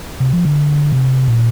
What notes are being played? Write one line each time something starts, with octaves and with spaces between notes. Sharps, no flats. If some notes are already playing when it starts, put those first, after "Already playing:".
C3
F3
D3
C3
A#2